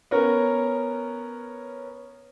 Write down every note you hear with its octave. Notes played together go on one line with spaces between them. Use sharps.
B3 C#4 A#4